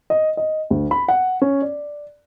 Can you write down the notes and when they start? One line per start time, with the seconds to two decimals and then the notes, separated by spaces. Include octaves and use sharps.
0.10 D#5
0.37 D#5
0.70 D2
0.91 B5
1.08 F#5
1.42 C#4
1.62 D5